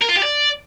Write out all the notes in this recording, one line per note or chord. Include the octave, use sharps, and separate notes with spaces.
A#4
F4
G4
D5